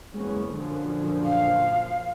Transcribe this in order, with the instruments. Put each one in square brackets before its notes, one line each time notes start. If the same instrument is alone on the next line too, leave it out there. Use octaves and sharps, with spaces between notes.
[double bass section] F#1 E2 C#4 [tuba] G#3
[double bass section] A#1 F#2 F3 [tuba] D3
[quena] F5